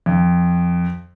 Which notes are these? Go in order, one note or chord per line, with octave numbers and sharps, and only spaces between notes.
F2